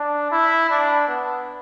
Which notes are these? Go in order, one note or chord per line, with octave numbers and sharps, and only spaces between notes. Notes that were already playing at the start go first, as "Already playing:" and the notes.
Already playing: D4
E4
D4
B3